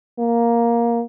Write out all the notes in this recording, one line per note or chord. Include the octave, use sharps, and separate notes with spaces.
A#3